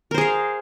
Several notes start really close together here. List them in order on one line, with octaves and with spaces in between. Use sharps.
A#4 C5 G#4 F5